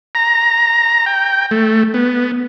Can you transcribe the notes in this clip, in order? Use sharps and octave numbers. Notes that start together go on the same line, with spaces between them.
A#5
G5
A3
B3